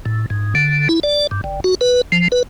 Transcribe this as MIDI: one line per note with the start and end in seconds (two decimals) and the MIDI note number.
0.05 0.26 45
0.30 0.54 44
0.55 0.88 50
0.89 1.00 64
1.03 1.27 74
1.31 1.41 43
1.44 1.60 31
1.64 1.75 66
1.81 2.01 71
2.12 2.28 53
2.32 2.43 71